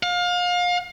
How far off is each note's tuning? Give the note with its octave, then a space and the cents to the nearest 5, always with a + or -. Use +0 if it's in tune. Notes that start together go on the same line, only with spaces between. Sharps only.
F5 +30